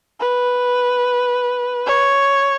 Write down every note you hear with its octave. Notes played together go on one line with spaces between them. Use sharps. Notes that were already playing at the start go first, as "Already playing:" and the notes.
B4
C#5